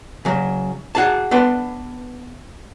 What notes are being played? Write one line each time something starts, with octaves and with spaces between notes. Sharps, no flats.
C#3 F#3
F#4 G#4 A5
B3 D4 B4 C6